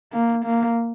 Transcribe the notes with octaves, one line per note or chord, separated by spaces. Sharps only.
A#3
A#3